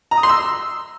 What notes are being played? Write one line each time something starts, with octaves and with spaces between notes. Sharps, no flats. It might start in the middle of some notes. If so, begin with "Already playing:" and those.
A#5
D#6
C6
E6